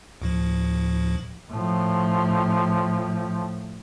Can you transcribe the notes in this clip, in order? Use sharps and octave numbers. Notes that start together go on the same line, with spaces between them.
D2 A2 F3
A2 F3